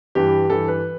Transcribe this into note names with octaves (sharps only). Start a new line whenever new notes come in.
G2 E3 G4
G2 E3 A4
B4